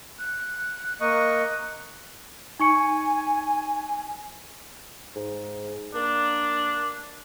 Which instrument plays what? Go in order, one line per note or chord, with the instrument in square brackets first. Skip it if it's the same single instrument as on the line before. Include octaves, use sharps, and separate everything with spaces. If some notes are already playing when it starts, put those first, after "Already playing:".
[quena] F#6
[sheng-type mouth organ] A#3 D#5 C#6
[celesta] D#4 C#6 C#7 [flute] G#5
[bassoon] G#2
[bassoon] A#3 [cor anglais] D4